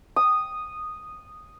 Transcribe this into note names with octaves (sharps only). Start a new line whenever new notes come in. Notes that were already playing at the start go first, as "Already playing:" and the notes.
D#6